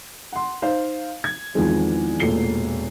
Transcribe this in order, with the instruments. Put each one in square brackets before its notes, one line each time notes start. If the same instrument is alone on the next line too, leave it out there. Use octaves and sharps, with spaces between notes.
[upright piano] F#5 C6
D#4 C5 F5
G#6
E2 D#3 F3 G#3 C4
E1 A1 A#2 A4 C7 G7